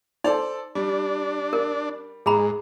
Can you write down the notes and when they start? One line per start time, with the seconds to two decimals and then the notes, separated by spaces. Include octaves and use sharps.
0.24 D#4 A4 C5 D5
0.75 G3 D4
1.53 A#4
2.26 G#2 G#4 A#5 B5